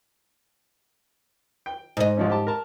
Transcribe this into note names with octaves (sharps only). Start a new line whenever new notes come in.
G5
G#2 D#5
C2 F3 C#4
G4 A5
A#4 A5